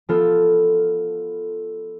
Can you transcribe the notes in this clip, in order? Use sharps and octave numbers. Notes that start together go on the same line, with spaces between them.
F3 B3 F4 A4